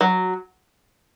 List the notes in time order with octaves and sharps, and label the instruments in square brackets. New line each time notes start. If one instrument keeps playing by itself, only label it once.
[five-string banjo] F#3